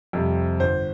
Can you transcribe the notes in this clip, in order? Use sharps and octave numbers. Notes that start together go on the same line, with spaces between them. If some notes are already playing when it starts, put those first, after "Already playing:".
F2 C3 G3
G1 C5